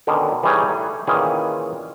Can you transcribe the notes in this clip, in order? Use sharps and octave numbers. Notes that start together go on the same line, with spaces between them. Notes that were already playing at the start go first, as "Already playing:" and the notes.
B2 D3 D#3 C#4
E3 G3 A3 D#4 G#4 C#5
A3
A#2 D#3 E3 C#4 G#4